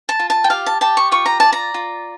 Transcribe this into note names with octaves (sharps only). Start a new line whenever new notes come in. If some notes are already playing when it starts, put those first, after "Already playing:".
A5
F4
A5
G5
G4 F5
A5
G4 A5
C#6
F4 C#6
A#5
D5 A5
A#5
F4